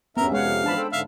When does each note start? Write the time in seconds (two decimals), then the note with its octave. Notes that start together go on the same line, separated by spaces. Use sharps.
0.17 E2 G2 B3 C#4 A#4 E5
0.32 F2 C3 G#3 C#5 F5 F#5
0.64 G#2 E3 F3 D4 A5 B5
0.77 A4 C5 G5
0.92 G#2 D3 E5 F5